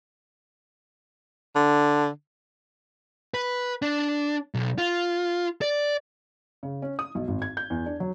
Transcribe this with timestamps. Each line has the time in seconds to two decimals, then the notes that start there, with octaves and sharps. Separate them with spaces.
1.55 D3
3.34 B4
3.82 D4
4.54 B1
4.78 F4
5.62 D5
6.63 C#3
6.82 C#4
6.99 D#6
7.15 B1
7.28 G#1
7.42 G#6
7.57 G6
7.70 E2
7.86 D4
8.00 F#3